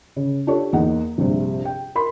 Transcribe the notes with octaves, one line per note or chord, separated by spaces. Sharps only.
C#3
D4 F4 G4 A4 C#5
E2 A#3 D#4 F#5
A#1 G2 C3
G5
A#4 B5 C6